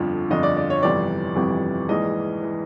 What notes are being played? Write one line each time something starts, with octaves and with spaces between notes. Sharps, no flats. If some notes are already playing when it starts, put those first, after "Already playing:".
Already playing: G1 F2 D3 F3
G1 F2 D3 F3 D#5
D5
D5
C#5
G1 F2 C3 E3 D5
G1 F2 C3 E3
A#1 G#2 E3 D#5
E3